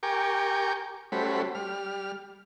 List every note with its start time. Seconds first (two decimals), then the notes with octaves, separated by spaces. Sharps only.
0.03 G4 A#4 G5 G#5 C#6 D6
1.12 G3 A3 C#4 F#4 C5 B5
1.55 G3 F6